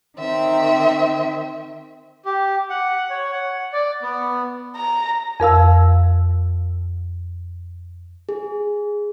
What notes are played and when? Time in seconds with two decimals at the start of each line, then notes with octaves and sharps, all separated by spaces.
0.19 D#3 C4 E5
2.25 G4
2.70 F#5
3.10 C#5
3.33 F#5
3.73 D5
4.03 B3
4.76 A#5
5.40 F2 A#4 F5 E6
8.29 G#4